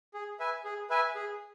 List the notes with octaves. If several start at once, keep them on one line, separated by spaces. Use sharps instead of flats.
G#4
B4 E5 G#5
G#4
B4 E5 G#5
G#4